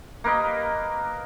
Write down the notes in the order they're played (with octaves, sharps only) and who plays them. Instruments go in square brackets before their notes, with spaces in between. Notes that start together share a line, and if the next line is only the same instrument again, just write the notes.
[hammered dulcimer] A#3 A#4 B4 D#5